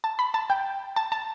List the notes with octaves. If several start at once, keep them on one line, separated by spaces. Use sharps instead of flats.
A5
B5
A5
G5
A5
A5